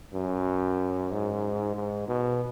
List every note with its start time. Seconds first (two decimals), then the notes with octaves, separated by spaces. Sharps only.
0.14 F#2
1.12 G#2
1.76 G#2
2.08 B2